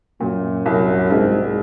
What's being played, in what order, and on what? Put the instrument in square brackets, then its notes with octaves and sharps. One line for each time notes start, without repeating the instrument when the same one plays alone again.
[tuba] F#2 [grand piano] A#2
[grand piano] C2 [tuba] F#2
[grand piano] C2 [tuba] G#2